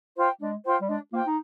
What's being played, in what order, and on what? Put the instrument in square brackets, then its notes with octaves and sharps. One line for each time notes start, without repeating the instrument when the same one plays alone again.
[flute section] F4 C5 G5
[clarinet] G#3 [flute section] D4
[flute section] F4 C5 G5
[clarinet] G3
[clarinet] G#3 [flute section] D4
[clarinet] A#3 [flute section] F4 C5 G5
[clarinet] D#4